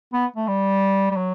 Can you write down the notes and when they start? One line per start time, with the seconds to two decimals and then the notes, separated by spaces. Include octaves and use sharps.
0.13 B3
0.36 A3
0.48 G3
1.11 G3
1.16 F#3